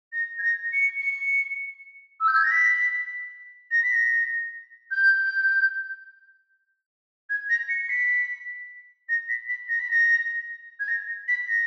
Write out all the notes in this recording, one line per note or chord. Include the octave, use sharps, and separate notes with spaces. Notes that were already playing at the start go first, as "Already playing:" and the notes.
A#6
G#6
A#6
C#7
C#7
E6
G6
G#6
A#6
B6
A#6
B6
A#6
G6
G#6
A#6
C#7
C#7
B6
A#6
B6
B6
A#6
B6
A#6
G#6
A#6
B6
A#6